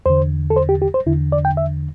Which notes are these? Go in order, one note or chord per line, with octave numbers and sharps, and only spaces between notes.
E2 D3 C5
A4
C5
G4
G4
C5
E2 D3 E4
D5
G5
E5